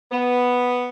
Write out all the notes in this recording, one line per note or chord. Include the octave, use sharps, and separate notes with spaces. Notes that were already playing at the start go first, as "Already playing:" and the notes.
B3